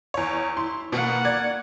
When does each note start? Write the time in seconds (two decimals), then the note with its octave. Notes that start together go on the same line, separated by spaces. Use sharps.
0.14 E2 C#5
0.57 E4 C6
0.92 B2 A#3 F#5
1.25 D5 G#6